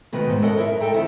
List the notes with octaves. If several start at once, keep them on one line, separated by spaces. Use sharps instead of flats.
B2 D#3 D#4 F#4 B4
G#2
A4 A#4 C#5 D#5 F#5
D#4 E4 A#4 E5
A4 G5 A#5
F2 D#3 E4